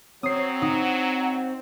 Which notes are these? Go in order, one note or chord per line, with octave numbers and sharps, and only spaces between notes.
F#3 C4 C#5 D#6 C7
D#4 F#5